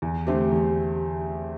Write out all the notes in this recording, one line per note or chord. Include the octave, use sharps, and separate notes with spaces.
E2
D3 A3 C4 G4
E2